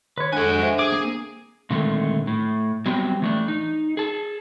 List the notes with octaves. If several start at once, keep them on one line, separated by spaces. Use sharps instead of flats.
D#3 B4 C#5
G#3 D4 F#4 A4 F#5 G#5 F#6
D4 C5 E5
G#4 D6
A#3 C4
A#2 D3 D#3 G#3 A3 C4
A2
F#3 G3 B3 C4 G4 G5
E3 A3 D4
D#4
G#4 A5